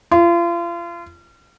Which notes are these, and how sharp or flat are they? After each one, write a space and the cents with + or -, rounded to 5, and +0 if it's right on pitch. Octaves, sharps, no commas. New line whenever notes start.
F4 -35